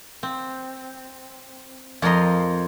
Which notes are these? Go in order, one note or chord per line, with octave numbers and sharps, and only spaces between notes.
C4
F2 A#4 D#5 C6